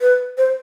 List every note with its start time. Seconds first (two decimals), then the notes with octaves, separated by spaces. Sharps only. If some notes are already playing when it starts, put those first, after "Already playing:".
0.01 B4
0.38 C5